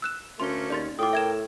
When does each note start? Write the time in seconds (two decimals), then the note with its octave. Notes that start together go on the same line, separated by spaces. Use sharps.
0.02 E6 F#6 E7
0.40 D2 A3 A#3 C#4 C6 G7
0.70 D#2 D5 C6 A6
0.99 A2 F4 G5 D6 D#6
1.13 A#4 E5 G#6 E7